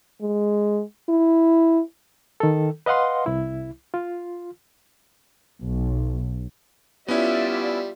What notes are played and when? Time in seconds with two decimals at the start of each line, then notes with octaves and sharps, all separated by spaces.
0.21 G#3
1.09 E4
2.40 D#3 A4
2.86 B4 D#5 F5 F#5 C6
3.26 C2 E4
3.94 F4
5.62 B1
7.08 G3 B3 C#4 E4 F4 D5 E5